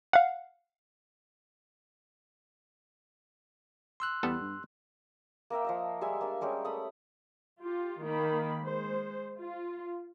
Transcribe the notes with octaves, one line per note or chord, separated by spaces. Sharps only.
F5 F#5
C6 E6 F#6
E2 G3 B3 A4
G2
A#3 A#4 E5 G5
F3 D#5 E5
G3 G#3 E5 G#5
A#3 D4
G3 G#3 C#4 G4
A3 B5 D#6
F4 G4
D#3 A#3 B5
G#3 C5
F4